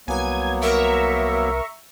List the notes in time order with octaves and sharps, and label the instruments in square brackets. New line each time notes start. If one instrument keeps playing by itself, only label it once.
[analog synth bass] C2 [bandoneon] F#3 A#3 B3 [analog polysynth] G#5 G#6
[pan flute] A#4 [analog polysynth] E5 A#5 C#6